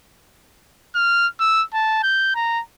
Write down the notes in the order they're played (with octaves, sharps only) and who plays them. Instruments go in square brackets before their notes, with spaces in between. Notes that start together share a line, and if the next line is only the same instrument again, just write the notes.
[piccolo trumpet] F6
E6
A5
G6
A#5